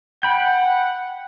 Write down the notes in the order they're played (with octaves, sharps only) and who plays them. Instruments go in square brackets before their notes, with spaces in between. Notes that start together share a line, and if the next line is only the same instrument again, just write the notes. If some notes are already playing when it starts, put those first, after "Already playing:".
[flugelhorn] F#5 [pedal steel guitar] G5 B5 G6